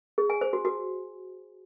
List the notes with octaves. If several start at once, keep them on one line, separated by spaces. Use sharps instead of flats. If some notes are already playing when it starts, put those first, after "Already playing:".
G#4
G#5
C5
F#4
F#4